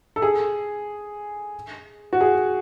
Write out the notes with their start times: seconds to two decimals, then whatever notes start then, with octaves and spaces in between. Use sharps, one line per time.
0.16 A4
0.22 G#4
2.13 F#4
2.21 G#4